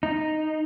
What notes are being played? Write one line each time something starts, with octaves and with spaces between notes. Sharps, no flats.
D#4